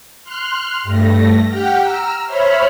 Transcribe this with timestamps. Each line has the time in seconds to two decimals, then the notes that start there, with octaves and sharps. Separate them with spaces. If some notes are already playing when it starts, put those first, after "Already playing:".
0.24 C6 F6 F#6
0.83 G2 A3 A#6
1.47 G4 F#5 G5 F6
1.79 A#5 E6 F6
2.26 C5 C#5 E5 B5 F6